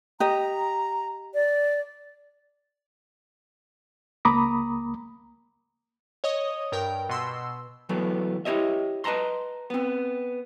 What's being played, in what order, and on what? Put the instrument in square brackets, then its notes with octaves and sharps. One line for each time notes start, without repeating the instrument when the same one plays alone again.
[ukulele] G4 D#5 [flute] A#5
[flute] D5
[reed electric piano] C#2 A#3 A#5 B5 D6 D#6
[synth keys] C#5 D#5 D#6
G2 A#4 G5
B2 C6 E6
[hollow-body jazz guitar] E3 F#3 A3 B3
E4 G4 C#5 D#5 E5
B4 D#5 A5 A#5 C6
B3 C4